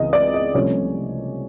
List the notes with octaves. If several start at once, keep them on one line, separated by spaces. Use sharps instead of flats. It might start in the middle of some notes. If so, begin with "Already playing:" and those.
Already playing: C#2 C#3 E3 G#3 C4 D#5
D5
D#5
C2 C3 F3 A3 C#4 C#5